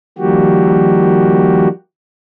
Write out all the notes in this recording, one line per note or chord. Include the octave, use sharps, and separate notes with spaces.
D#3 F3 G3 A#3 F#4 G4